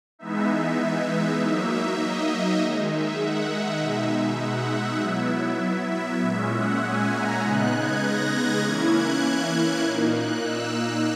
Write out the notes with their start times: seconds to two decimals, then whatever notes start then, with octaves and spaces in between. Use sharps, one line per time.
0.19 E3 G#3 B3 D#4 E5
1.39 F#3 A#3 D#4 E5
1.69 E5
1.99 D#5
2.60 D#3 G#3 D#4
2.90 E5
3.19 F#5
3.80 B2 G#3 D#4 E5
4.40 F#5
4.70 E5
5.00 F#3 B3 E4 E5
5.91 E5
6.20 A#2 G#3 C#4
6.51 F#5
6.81 G#5
7.11 A#5
7.41 C#3 G#3 B3 D#4 F#6
7.71 G#6
8.01 A#6
8.31 G#6
8.61 E3 A#3 C#4 E4
8.92 F#6
9.82 A#2 A#3 D#4
10.12 F#6
10.41 E6